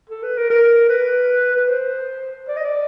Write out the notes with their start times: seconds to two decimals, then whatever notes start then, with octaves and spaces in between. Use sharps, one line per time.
0.10 A4
0.23 B4
0.37 A#4
0.50 A#4
0.89 B4
1.57 B4
1.68 C5
2.48 D5
2.56 D#5
2.64 D5